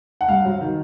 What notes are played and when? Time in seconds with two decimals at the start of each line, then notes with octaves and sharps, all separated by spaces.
0.21 F#5
0.28 G2 F5
0.45 F#3
0.61 D#3